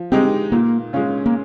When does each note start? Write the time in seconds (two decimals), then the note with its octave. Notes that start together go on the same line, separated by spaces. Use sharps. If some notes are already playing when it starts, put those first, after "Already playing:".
Already playing: F3
0.12 G#3 C4 D#4 G4
0.52 A#2 A#3
0.93 G#3 C#4 F4
1.26 A#3